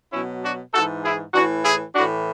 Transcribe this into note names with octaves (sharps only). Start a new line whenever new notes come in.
B2 F#3 C#4 E4
D4 F#4
G#2 E3 F#4 A4
E4 G#4
E3 D4 F#4
A2
E4 G#4
A2 E3 D4 F#4